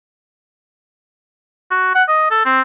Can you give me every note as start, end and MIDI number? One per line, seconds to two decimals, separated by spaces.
1.71 1.94 66
1.95 2.03 78
2.08 2.30 75
2.31 2.42 69
2.46 2.62 60